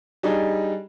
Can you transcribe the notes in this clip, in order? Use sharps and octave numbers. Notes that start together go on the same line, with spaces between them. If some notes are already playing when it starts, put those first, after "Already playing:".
G3 D4 D#4 G#4